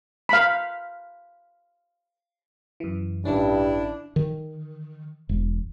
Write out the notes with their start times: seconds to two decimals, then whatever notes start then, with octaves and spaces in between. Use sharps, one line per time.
0.29 F5 B5
2.80 F#2 E3
3.25 A1 G2 D#3 C#4 D4 E4
4.16 D#3
5.29 E1